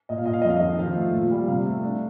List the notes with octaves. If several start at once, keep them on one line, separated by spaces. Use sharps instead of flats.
A#2 D#5
F5
A#2 D#5
F5
F2 D#5
F5
D#3 D#5
F3 F5
A3
A#2
G3
C3 F5
A3
D4